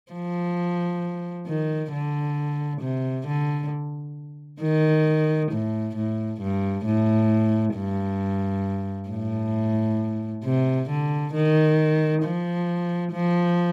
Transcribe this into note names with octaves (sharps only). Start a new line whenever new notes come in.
F3
D#3
D3
C3
D3
D#3
A2
A2
G2
A2
G2
A2
C3
D3
D#3
F3
F3